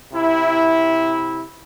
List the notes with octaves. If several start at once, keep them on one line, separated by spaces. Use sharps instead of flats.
C3 E4